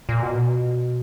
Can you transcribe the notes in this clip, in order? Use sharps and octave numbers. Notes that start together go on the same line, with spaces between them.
A#2
B2